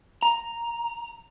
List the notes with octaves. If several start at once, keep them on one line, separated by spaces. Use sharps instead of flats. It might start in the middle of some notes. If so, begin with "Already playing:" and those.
A#5